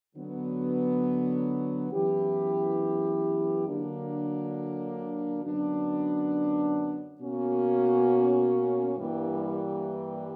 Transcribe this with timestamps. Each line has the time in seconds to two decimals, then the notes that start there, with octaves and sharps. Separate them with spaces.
0.15 D3 F#3 B3
1.91 F#2 E3 B3 E4 G4
3.67 D3 F#3 A#3 D4
5.42 F#2 D3 F#3 B3 D4
7.19 B2 A#3 C#4 F#4
8.95 G2 E3 G3 A#3